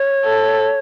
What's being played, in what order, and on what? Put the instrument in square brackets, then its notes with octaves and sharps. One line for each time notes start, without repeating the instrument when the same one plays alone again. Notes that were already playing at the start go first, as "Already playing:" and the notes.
Already playing: [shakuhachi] C#5
[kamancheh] A4